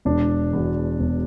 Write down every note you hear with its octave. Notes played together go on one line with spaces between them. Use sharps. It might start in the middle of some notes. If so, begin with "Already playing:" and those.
E1 D4
E2 B2
E1